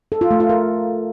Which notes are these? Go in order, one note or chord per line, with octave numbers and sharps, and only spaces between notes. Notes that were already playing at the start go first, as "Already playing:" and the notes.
A4
F4
A3
F4
A#4